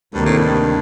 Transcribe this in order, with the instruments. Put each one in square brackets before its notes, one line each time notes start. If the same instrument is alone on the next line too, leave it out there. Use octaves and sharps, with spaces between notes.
[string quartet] D2 C3 D#3 A#3 [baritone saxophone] G2
[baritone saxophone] A2
G2